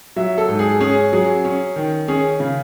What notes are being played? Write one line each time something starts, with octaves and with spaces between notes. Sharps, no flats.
F#3 E5
A4
G#2
G#4
C#4 G#4
F#3 G#4
C#4
D#3
C#4 G#4
C#3